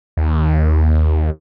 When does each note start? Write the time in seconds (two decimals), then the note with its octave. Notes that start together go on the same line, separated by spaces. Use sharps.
0.17 D#2